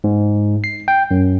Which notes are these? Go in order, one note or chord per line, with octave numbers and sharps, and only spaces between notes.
G#2
C7
G5
F#2